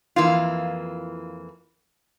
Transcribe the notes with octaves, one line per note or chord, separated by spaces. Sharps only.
F2 E3 A#3 F4